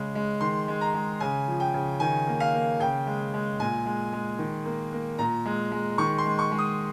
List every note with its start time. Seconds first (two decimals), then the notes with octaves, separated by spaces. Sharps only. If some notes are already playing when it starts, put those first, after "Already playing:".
Already playing: C#3 G#3
0.15 G#3
0.41 D#3 C6
0.68 G#3
0.81 A#5
0.94 G#3
1.20 C#3 G#5
1.48 F3
1.60 G5
1.74 C#3
2.00 D#3 G#5
2.28 A#3
2.40 F5
2.54 A#3
2.80 C#3 G5
3.07 G#3
3.34 G#3
3.60 A#2 G#5
3.86 G#3
4.13 G#3
4.39 D#3
4.65 A#3
4.93 A#3
5.19 A#2 A#5
5.46 G#3
5.72 G#3
5.98 D#3 C#6
6.18 C6
6.25 G#3
6.39 C#6
6.52 G#3
6.58 D#6